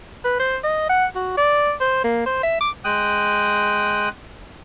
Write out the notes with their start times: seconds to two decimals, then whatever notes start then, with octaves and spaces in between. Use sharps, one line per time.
0.25 B4
0.40 C5
0.64 D#5
0.89 F#5
1.15 F#4
1.37 D5
1.81 C5
2.04 A#3
2.26 C5
2.43 E5
2.61 D6
2.85 G#3 G5 D#6 F#6